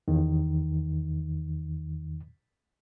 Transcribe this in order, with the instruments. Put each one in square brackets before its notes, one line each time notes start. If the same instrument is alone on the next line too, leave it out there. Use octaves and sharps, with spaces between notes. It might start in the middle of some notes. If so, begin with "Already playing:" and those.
[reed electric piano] E2 D#3